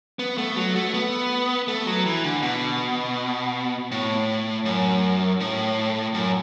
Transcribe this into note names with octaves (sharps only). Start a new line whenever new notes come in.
B3
A3
F#3
A3
B3
A3
F#3
E3
D3
B2
A2
F#2
A2
F#2